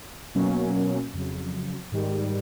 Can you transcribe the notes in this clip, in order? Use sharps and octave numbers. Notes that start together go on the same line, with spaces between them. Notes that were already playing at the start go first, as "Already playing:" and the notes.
B2 F#3 A#3 C#4
F2 C#3 F#3
G#2 D#3 G3